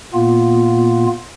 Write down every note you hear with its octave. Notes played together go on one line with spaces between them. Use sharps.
A#2 A#3 B3 F4